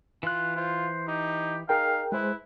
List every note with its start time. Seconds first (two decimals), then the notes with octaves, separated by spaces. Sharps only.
0.23 E3 F4 F#6
0.56 F4 C5
1.08 D#4 G4
1.69 D#4 G#4 A#4 F5 G5
2.12 G#3 E4 G#4 B4 C5